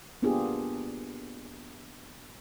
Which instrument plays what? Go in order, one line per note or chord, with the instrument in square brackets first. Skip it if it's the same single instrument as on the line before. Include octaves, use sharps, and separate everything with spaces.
[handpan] A#3 B3 D4 F4 G4 G#4